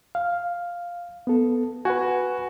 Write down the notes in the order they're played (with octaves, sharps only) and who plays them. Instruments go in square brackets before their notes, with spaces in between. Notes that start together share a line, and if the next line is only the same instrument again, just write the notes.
[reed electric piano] F5
B3 A4
[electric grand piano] F#4 [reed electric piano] B4 F#5 G#5